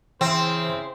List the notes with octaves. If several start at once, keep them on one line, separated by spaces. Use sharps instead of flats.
C#3 E3 C4 E4 C5 G5 C6